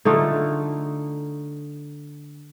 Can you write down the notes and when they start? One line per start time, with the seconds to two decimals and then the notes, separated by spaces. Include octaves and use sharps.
0.05 D3 A3 D#4 F4